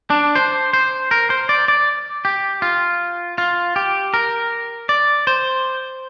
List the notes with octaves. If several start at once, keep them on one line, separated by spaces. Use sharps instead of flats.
D4
C5
C5
A#4
C5
D5
D5
G4
F4
F4
G4
A#4
D5
C5